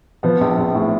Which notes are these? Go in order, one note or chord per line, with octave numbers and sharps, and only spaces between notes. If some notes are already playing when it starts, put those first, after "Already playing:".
F3 B3
A#1
A#1
A2